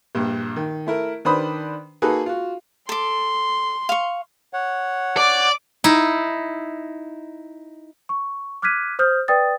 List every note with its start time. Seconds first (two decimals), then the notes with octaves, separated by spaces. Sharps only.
0.15 A#1 G2
0.56 D#3
0.87 A3 E4 A#4
1.25 D#3 D4 B4 C5 B5 D#6
2.02 A#3 D#4 F#4 G#4 A4 B4
2.26 F4 F#4
2.89 A4 C6 D6
3.89 F5 C#6
4.53 C#5 F#5
5.17 D5 D6
5.84 D#4 E4
8.09 C#6
8.62 D6 F6 F#6 G#6 B6 D#7
8.99 C5 D#6 F6 G6
9.28 B4 D5 G5 D#6 A6